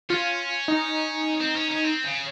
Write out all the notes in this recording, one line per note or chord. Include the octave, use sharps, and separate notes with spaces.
C#4 F4
D#4
C4
C#4
C#4
C4
C#3